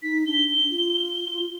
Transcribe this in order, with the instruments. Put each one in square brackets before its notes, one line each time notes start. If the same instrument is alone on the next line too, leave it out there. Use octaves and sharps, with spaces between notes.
[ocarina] D#4 [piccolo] B6
[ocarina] D4 [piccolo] G7
[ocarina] F4